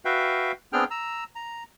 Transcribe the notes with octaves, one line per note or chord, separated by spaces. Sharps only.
F#4 B4 E5 F5 G5
B3 C4 D4 G#4 G5 F6
A#5 E6
A#5